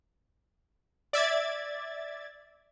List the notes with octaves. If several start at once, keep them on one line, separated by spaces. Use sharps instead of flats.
D5 E5 G#6 A6